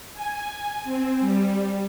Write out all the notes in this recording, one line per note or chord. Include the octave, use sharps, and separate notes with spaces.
G#5
C4
G3